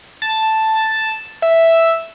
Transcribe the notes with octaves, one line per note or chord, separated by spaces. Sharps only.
A5
E5